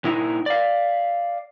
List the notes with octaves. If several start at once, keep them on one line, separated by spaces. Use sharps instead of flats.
A#2 D#4 E4
D5 F5